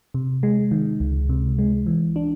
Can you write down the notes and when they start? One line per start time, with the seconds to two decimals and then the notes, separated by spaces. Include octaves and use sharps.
0.14 C3
0.43 G#3
0.71 D#3
1.00 C#2
1.29 C3
1.59 G#3
1.87 E3
2.16 D4